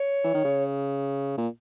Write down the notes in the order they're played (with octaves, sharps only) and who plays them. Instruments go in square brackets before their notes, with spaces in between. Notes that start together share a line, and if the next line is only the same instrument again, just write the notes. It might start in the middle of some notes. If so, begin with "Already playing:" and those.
Already playing: [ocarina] C#5
[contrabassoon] E3
D#3
C#3
A#2